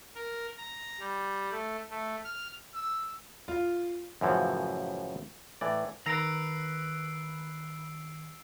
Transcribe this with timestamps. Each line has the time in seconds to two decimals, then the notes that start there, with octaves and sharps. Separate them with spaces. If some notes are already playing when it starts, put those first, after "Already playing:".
0.15 A#4
0.57 A#5
0.99 G3
1.51 A3
1.90 A3
2.24 F6
2.75 E6
3.48 F4
4.21 F#2 A2 C#3 E3 F3
5.61 A2 E3 D5
6.06 D#3 B4 A#5 E6 C7 D7